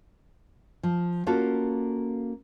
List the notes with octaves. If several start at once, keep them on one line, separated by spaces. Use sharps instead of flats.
F3
A#3 C#4 F4 F#4 A4